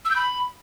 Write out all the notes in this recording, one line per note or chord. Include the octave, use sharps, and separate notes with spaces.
E6
G6
B5